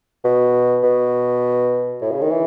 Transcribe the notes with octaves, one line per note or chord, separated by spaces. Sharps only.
B2
B2
A2
C#3
D#3
E3